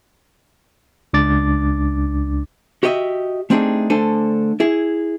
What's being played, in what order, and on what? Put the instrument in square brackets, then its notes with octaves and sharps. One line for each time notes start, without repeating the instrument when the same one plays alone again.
[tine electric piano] C#2 D4 D6 A6
[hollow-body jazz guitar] F#4 G4 A#4 D#5 E5
A3 C4 D4 D#4 G4 G#4
D3 A3 D4 A4 C5 G#5
E4 G#4